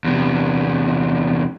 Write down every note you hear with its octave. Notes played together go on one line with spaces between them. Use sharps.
E2 C3